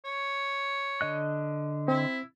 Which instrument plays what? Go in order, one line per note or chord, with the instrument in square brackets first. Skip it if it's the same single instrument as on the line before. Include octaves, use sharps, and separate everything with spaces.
[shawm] C#5
[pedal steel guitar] D3 D#5 F#6
[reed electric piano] C4 [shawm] E4